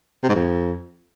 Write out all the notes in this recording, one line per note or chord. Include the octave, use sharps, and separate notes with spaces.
C3
G#2
F2